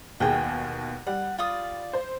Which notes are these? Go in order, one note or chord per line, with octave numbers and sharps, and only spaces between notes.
D#2 B2 G#4 G5
G3 F#5
F4 D5 D#6
C5